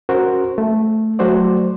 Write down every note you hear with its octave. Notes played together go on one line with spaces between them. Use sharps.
C#4 F#4 A#4 C5
A3
F#3 A3 F#4 C5 D5